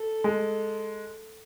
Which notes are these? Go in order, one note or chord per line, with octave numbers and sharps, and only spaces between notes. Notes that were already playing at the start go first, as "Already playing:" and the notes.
Already playing: A4
G#3